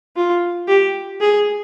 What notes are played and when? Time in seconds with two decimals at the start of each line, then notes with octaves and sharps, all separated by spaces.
0.16 F4
0.68 G4
1.20 G#4